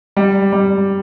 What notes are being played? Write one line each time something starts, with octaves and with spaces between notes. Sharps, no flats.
G3
G3